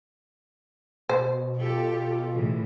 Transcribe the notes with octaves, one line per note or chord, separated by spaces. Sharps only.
B2 C5
F4 G4 A4
A2 C#3 E3